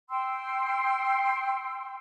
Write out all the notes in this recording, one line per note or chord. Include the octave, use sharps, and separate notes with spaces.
G5 C6 E6